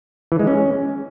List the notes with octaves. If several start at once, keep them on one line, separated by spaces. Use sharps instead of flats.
E3
G#3
C#4